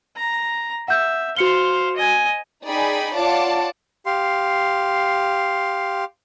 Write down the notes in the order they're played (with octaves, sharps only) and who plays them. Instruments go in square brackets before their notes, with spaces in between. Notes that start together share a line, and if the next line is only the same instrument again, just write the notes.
[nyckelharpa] A#5
[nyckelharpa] E5 [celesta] F#5 G6
[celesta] F#4 C#7 G7 [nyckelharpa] C5 F5
[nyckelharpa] D#5 G#5
[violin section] D#4 G#4 D5 G5 G#5 B5
F4 C#5 D5 F#5 A5 D6
[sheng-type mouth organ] G4 F5 C6